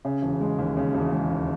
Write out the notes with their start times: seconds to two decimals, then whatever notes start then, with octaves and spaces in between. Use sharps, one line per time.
0.05 C#3
0.22 E1
0.41 G#3
0.59 D#2
0.77 C#3
0.95 E1
1.12 G#3
1.31 D#2